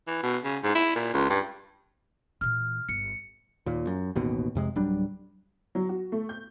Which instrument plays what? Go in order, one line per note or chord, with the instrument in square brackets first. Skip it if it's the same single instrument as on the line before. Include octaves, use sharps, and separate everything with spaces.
[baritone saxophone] E3
B2
C#3
G#2
E4
A#2
C#2
G2
[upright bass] A#2 E3 [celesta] F6
[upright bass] G1 [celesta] C#7
[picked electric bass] D#2 A#2
F#2
A1 D#2 B2
F2 C3 G#3
D1 F#3 G3 D4
[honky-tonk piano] F#3
F#4
A3
G6